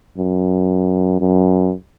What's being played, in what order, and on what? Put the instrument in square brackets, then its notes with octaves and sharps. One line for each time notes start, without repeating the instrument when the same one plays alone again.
[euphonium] F#2
F#2